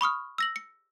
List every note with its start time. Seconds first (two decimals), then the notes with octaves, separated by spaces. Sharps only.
0.01 B5 C#6 D#6 F6
0.38 E6 A#6 F#7
0.56 C#7